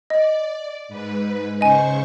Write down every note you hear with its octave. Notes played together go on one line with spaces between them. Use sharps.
D5 D#5
G#2 B4
C#3 C5 D#5 G#5 C#6